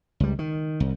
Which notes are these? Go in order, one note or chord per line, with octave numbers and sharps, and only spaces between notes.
C#2 G3
D#3
C2